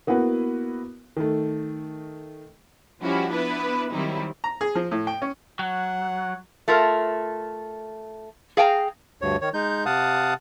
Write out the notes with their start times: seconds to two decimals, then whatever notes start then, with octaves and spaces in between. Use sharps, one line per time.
0.07 A#3 B3 E4 F#4 B4
1.17 D#3 A3
3.00 F3 G3 C#4 E4 F#4
3.31 B3 D4 E4 B4
3.91 D#3 F#3 G3 C4 D#4 E4
4.44 A#5
4.61 G#4
4.75 F3
4.91 A2
5.07 G5
5.22 C#4
5.59 F#3 F#5
6.68 A3 F4 A#4
8.57 G#4 F5 G5 G#5 A#5
9.22 D2 G2 C#5
9.41 D#3 C#5
9.54 G#3 D#4 G6
9.86 C3 F5 F#5 A5 D#6